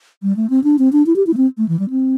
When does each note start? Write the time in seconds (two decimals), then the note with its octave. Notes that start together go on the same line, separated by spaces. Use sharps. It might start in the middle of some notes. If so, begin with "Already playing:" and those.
0.23 G3
0.36 A3
0.50 C4
0.64 D4
0.78 C4
0.92 D4
1.06 E4
1.16 G4
1.27 E4
1.33 A3
1.37 C4
1.57 A3
1.68 E3
1.79 G3
1.90 C4